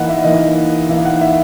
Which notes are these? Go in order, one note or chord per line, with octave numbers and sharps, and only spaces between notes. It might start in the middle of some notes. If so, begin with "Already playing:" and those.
Already playing: E3 A#3 D#4 D#5 F#5
E5
E3 A#3 D#4 D#5
E3 A#3 D#4 E5
F#5
E5